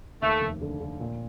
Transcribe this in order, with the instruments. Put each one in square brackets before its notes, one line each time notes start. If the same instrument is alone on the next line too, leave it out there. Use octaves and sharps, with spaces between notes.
[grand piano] D#2 [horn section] A3
[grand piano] F1
D3
D3
A#2